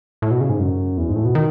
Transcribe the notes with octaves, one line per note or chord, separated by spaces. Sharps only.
A2
B2
C#3
G#2
F#2
E2
G#2
A2
B2
D#3